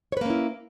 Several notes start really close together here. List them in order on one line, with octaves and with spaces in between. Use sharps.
C#5 B4 A#3 C#4 E4